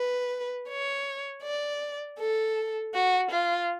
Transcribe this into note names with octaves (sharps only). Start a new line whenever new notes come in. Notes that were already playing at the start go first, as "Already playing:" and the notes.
Already playing: B4
C#5
D5
A4
F#4
F4